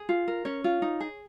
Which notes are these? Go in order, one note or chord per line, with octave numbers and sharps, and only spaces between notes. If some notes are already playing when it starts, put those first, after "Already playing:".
Already playing: G#4
F4
A#4
C#4 C#5
F4
D#4
G#4